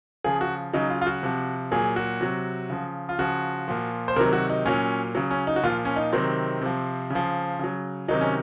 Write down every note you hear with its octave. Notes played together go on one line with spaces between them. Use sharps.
C#3 F3 G#4
F#4
C#3 F#3 D#4
F4
F4
F#4
C3 F3
A#2 F#3 G#4
F#4
C3 F#3
C#3 F3
F4
C#3 F3 F#4
A#2 F3
C5
C3 D#3 F#3 A#4
F#4
D#4
A#2 F#3 C#4
C#3 F#3
C#4
D#4
F#4
A#2 F3 F4
C#4
D#4
C3 D#3 F#3 C4
C3 F3
C#3 F3
C#3 F#3
C3 D#3 F#3 D#4
C#4